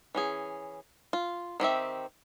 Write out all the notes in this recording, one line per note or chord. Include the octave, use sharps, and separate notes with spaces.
E3 C#4 G#4
F4
D#3 C4 G4 E5